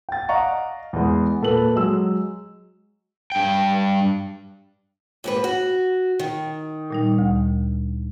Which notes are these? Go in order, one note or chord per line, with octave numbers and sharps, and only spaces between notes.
G5 A6
D5 D#5 F5 F#5 A#5 C#6
E2 G#3
A#2 A4 B4 F#7
F#3 G#3 E6
G2 G5
D#2 G#2 B4
F#4
D#3
A#2 G3 D#4
D2